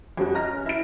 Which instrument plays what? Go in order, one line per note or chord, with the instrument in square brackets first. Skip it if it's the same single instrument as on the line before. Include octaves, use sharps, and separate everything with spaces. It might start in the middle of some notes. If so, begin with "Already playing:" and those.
[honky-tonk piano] F2 G3 C#4 F#4 F#6
D#5 A#5 F6 A#6
C#4
E4 D7